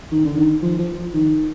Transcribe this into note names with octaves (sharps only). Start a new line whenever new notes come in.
D#3
D3
D#3
F3
F3
D#3